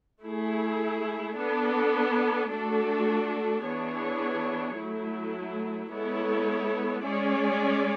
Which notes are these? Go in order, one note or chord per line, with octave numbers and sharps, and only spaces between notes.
A3 E4 G#4
B3 D4 A4
A3 D4 F#4 A4
E3 B3 D4 G#4 C#5
F#3 A3 E4
G#3 B3 E4 A4 C#5
G#3 C#4 G#4 D5